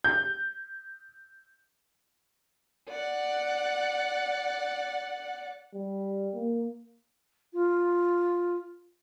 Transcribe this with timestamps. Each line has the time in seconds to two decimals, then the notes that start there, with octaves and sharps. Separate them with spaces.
0.04 G6
2.89 D5 F#5
5.74 G3
6.34 A#3
7.53 F4